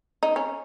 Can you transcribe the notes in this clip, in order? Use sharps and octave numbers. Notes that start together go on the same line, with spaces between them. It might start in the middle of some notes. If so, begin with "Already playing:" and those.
D#4
C#4